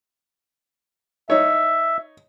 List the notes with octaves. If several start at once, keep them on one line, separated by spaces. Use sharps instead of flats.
D#4 C#5 E5